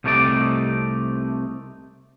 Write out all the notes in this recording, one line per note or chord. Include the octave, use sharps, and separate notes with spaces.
C2 C3 A3 D#4 A4 D5